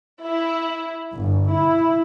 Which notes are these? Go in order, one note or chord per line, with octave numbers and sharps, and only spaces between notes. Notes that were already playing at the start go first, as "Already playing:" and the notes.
E4
G1
E4